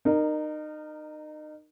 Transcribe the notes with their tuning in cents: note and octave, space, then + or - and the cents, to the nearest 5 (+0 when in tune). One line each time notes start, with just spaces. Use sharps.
D#4 -30 A#4 -5